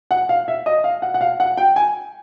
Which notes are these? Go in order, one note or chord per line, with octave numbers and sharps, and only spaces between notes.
F#5
F5
E5
D#5
F5
F#5
F#5
F5
F#5
G5
G#5